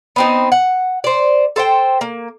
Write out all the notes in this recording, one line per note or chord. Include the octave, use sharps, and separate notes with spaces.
B3 C4 D#4
F#5
C5 D5
A4 C5 E5 G5
A#3